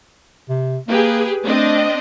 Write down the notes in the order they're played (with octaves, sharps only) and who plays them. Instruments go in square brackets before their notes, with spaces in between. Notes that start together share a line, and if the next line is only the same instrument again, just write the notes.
[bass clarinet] C3
[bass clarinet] A#3 [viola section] G4 G#4 B4
[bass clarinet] A3 [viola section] C4 D4 D#5